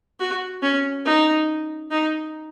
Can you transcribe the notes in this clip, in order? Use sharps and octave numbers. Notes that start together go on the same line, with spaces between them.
F#4
C#4
D#4
D#4